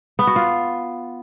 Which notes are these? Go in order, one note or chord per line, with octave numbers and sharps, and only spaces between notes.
B3
F#4
F4